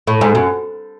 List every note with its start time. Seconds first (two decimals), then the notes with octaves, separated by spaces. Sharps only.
0.07 A2
0.21 G#2
0.35 F#2